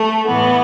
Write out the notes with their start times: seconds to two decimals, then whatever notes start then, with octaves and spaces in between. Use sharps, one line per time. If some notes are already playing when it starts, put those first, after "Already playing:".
Already playing: A3
0.27 A2 E3 B3